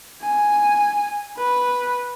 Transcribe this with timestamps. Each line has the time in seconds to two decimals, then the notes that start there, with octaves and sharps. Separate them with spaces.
0.22 G#5
1.38 B4